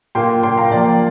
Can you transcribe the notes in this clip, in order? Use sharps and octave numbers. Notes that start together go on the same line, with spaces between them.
A#2 A#3 G5 C6
A#2 A#3 G5 C6
F5 A#5
A#2 F3 A#3 D5 G5